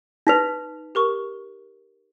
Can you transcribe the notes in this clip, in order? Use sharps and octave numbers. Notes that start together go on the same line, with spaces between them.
D#4 B4 A#6 B6 F7
G4 A#4 C#6